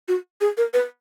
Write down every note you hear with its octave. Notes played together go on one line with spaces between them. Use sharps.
F#4
G#4
A#4
B4